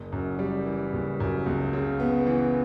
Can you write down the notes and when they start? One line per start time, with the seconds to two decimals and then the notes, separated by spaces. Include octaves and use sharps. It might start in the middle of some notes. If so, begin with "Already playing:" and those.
Already playing: F#1
0.12 F#2
0.39 G3
0.66 E3
0.93 F#1
1.20 F#2
1.46 C#2
1.73 C#3
2.00 B3
2.27 E3